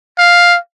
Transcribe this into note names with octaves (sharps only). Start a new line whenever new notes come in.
F5